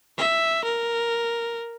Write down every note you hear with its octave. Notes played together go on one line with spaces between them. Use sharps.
E5
A#4